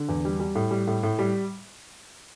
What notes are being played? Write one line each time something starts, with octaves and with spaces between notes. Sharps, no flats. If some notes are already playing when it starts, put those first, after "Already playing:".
Already playing: D3
E2
G3
G3
A2
G3
A2
A2
G3